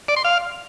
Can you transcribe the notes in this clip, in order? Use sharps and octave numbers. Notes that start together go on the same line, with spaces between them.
D5
C6
F5